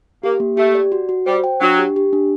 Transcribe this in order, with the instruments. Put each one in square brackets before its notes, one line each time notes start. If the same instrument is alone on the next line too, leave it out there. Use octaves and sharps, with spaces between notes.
[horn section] A#3 [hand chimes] G4
[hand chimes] A#3
[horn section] A3 [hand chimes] G4
[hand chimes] D5
F#4
F#4
[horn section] G3 [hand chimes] C5
[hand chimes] G5
[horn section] F#3 [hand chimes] D4
[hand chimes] G4
G4
D4